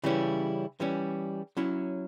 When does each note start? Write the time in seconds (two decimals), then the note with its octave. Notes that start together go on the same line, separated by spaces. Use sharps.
0.04 C#3 E3 G3 C#4 E4
0.80 E3 G3 C#4
1.57 F#3 C#4 E4